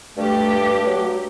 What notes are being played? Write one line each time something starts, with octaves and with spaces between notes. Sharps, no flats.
G2 A3 G4
F#3